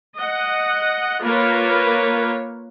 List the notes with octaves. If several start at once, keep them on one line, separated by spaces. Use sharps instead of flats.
D#5 F#5
A#3 F4 A#4 B4 C#5